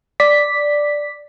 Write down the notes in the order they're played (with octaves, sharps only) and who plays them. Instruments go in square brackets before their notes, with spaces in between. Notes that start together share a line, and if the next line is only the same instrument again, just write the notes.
[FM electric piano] D5 B6